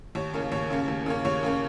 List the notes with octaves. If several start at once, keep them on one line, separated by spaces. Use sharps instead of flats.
D#2 C#5
C#3 A#3 C#4
D#2 C#5
C#3 A#3 C#4
D#2
C#3 A#3 C#4
D#2 C#5
C#3 A#3 C#4